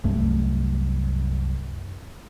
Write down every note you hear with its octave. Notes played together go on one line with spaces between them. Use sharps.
C2 F#2 A3